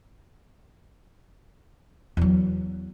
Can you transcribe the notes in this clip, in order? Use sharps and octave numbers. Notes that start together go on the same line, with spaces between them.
E2 F#3